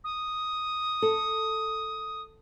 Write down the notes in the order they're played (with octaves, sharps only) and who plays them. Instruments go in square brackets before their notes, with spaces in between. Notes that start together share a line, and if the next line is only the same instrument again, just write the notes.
[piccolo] D#6
[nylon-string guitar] A4